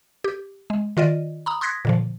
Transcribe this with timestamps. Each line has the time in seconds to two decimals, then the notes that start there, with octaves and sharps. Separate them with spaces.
0.24 G4
0.70 G#3
0.97 D#3 F4 D5 D#5
1.46 A#5 B5 D#6
1.61 C6 D#6 F#6 G#6 A#6 B6
1.85 A#2 D3 F3